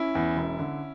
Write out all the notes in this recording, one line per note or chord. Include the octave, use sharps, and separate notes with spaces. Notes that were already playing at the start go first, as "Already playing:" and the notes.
Already playing: C#4 E4
E2
E1
D3